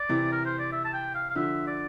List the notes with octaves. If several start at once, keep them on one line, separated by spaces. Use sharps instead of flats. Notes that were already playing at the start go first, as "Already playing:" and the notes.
Already playing: D5
C3 E3
A#4
C5
D5
E5
A5
G5
F5
F5
D3 F3 E5
D5